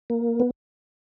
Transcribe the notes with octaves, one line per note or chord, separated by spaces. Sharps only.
A#3
B3